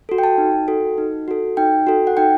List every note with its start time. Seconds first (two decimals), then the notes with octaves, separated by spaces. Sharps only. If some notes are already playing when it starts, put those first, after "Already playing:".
0.09 F#4 A4
0.18 G5
0.24 A5
0.38 D#4
0.68 F#4 A4
0.98 D#4
1.28 F#4 A4
1.57 D#4 G5
1.87 F#4 A4
2.07 F#5
2.17 D#4 G5